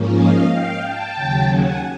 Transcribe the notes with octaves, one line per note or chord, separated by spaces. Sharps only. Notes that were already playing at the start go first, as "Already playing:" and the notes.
Already playing: G#2 F3 A#3 C#4
D#5 F5
F5 G5
G5 A5
D#2 C#3 F#3
F#5 G#5